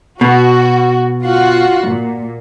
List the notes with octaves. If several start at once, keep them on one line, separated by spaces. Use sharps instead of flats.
B2 F#4
F4 F#4 F#5
A#2